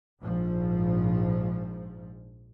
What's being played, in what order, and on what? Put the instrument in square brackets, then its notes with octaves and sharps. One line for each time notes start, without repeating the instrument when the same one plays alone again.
[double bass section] A#1 G#2 F3